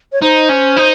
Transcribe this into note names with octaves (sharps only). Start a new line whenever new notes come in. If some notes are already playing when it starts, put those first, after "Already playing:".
C#5
D#4 C5
C#4
D#4